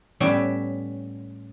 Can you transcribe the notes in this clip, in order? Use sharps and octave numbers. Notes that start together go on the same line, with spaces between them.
A2 G3 B3 C#4 E5 G5